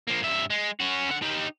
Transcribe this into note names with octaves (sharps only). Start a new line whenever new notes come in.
F3 A#3
G2 E5
G#3
C#4 F#4
D3 F#5
D#4 G4